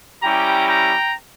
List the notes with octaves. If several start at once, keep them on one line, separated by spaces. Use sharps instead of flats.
G3 C#4 E4 G4 G5 A#5
G5 A#5